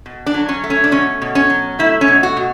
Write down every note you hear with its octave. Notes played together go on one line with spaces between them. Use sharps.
B2
D4
F#3
C#4
A3
C#4
D4
B2 C#4
B2
C#4
F#3
A3 E4
C#4
B2
F#4
B2